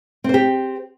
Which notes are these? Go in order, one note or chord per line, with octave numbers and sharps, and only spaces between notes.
C4 G4 C5